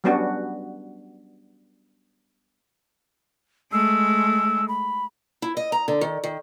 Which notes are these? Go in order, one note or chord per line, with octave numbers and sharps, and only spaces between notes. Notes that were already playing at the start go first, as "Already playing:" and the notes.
F#3 G3 B3 C#4 D4 F#4
G#3 A3 E6
B5
E4
D#5
A#5
D3
D#3
D#3